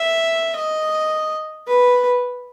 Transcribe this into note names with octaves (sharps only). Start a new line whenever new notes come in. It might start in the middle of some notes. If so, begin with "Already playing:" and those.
Already playing: E5
D#5
B4